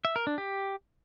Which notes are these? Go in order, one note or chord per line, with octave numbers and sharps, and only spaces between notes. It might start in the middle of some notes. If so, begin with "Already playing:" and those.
E5
A#4
D4
G4